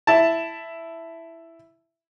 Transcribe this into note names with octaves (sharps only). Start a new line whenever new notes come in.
E4 A5